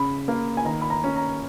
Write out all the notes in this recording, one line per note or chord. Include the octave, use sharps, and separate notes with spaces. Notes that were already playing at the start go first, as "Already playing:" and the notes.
Already playing: C#3 B5
A#3
G#5
D#3 A#5
B5
A#5
C#4
A#5